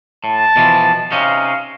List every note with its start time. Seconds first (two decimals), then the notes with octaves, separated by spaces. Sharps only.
0.24 A2 A5
0.56 B2 E3 F3
1.12 C3 C#4 D#4 F5